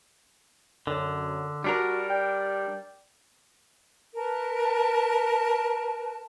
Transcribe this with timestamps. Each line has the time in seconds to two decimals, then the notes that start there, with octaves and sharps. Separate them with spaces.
0.87 F#2 D3
1.64 G3 D4 F#4 A#4
2.10 D5 G5
4.15 A#4 B4 A5